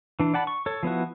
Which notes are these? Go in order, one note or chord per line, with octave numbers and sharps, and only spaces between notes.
E3 D4
D5 F#5 A5 B5
C#6
A4 C#5
F3 B3 E4 F#4